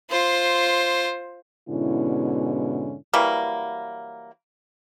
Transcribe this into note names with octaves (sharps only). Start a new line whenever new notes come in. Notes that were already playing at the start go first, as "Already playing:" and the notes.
F4 C5
G#2 B2 D3 C#4 E4
E3 F#3 G3 A#3